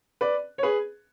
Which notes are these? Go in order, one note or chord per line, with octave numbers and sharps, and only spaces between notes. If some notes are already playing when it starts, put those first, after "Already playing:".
B4 D5
C#5
G#4 B4